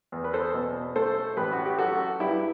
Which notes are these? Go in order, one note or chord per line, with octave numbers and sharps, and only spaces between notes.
E2
B4
A4 C5
B2
A3 A4 C5
A1 G4 B4
F#4
G4
F#3 F#4 A4
G2 E4 G4